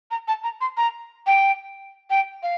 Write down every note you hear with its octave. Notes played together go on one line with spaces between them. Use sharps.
A#5
A5
A#5
C6
A#5
G5
G5
F5